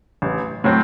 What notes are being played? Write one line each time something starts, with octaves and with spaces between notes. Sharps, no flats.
A1
A2 F#3 C4